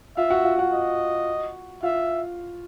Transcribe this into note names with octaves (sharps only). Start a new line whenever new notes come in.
F4 E5 F5
F#4 F#5
F4 F5
F#4 F#5
D#5
F4 E5 F5